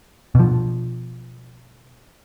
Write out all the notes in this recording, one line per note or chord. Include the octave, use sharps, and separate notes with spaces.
B2 F3